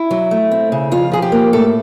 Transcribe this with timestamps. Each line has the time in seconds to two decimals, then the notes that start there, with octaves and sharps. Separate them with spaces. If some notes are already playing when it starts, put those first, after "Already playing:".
Already playing: E4
0.11 F#3
0.31 A3
0.51 C4
0.72 C#3
0.91 F2 F4
1.12 F3 G#4
1.22 G4
1.32 A#3
1.53 A2 A4